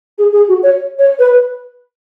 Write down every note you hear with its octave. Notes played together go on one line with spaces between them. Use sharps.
G#4
G#4
F#4
C#5
C#5
B4